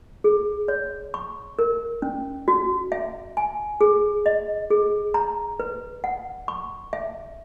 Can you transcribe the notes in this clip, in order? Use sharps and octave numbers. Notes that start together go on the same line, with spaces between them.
G#4
C#5
C#6
A#4
C#4
F#4
E5
G#5
G#4
D#5
G#4
A#5
B4
F#5
C#6
E5